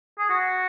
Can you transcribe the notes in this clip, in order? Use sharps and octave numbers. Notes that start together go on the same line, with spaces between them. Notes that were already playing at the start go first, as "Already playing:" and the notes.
G#4
F#4